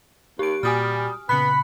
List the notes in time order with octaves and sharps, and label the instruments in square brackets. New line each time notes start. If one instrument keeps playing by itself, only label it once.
[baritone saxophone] D#2 [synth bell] G4 D7
[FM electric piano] A#2 F#4 [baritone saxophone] G3 [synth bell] G#5 D#6 F6
[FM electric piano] A#2 C#3 [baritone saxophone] B3 [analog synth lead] B5 [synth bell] F#6 C#7